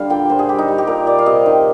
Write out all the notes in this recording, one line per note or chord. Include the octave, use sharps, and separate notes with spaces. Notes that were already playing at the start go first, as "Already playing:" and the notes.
Already playing: D3 G3 F5
A#2 G5
A#2 C5
G#4
G3 G4
D#4
G3
G4
A#2 A#4
A#2 D5
F5
C3 D#5
D#3